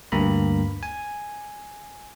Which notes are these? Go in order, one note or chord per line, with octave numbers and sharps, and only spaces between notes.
D2 G2 A#3 A#5 B5
G#5